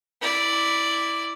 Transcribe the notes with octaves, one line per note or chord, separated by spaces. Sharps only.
E4 D5